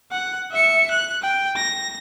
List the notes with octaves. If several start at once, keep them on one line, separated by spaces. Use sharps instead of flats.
F#5
E5 C#7
F#6
G5
A#6